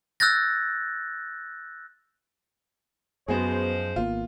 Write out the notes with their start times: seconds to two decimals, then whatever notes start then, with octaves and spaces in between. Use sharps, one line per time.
0.20 E6 F#6 G6 A6 A#6
3.28 F#2 F3 G#3 B3 F#4 G#4 C5
3.96 G#1 A#3 B3 F4